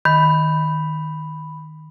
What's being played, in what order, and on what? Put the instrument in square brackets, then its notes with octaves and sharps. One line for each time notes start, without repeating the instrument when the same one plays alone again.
[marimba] D#3 [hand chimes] B5